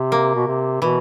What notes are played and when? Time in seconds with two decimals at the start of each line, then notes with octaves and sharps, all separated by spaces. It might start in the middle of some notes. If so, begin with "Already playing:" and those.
Already playing: C3
0.12 A#3
0.35 B2
0.47 C3
0.82 B2 E3